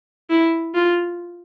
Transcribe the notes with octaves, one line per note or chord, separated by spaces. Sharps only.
E4
F4